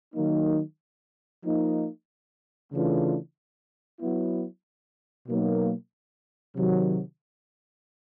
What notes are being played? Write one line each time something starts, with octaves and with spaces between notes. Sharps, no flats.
D#3 F#3 A#3 D#4
F3 A#3 D#4
C#3 E3 A3 D4 F4
F#3 B3 E4
B2 F#3 A#3 D#4
C3 D#3 F#3